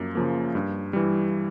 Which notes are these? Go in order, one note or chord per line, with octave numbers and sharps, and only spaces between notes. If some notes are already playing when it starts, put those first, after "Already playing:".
Already playing: F#2 F3 A#3
C#3 F3 A#3
G2
E3 G3